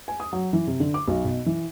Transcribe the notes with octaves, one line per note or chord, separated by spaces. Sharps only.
G#5
D#6
F#3
E3
C3
D3
D6
B1
B2
E3